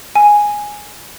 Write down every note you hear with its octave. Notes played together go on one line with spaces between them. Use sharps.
G#5